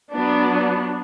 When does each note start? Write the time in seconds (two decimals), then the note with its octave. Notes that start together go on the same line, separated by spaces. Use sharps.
0.12 F#3 B3 D4